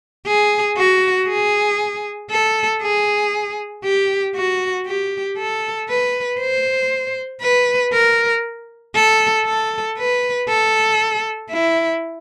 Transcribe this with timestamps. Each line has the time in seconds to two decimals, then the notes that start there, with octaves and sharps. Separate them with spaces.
0.27 G#4
0.78 F#4
1.29 G#4
2.31 A4
2.82 G#4
3.84 G4
4.36 F#4
4.86 G4
5.38 A4
5.89 B4
6.40 C5
7.43 B4
7.93 A#4
8.95 A4
9.46 A4
9.98 B4
10.48 A4
11.51 E4